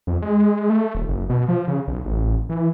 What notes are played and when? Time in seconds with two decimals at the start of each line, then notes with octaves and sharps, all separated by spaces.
0.07 F2
0.22 G#3
0.70 A3
0.95 D#1
1.09 F#1
1.30 B2
1.48 F3
1.67 C#3
1.88 B1
2.05 A1
2.49 E3